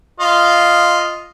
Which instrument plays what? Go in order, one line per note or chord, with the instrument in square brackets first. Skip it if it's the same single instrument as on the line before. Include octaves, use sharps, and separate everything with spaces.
[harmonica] F4 D#5